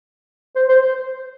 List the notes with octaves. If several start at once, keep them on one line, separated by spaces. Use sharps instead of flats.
C5
C5